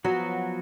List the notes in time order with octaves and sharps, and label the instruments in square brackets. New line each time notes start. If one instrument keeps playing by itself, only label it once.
[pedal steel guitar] F3 B3 F#4 B4 [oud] F#3